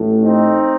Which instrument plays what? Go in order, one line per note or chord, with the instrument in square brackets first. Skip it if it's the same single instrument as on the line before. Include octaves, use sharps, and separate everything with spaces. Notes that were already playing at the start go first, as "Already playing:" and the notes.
Already playing: [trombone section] A1 A2 A3
C4 D#4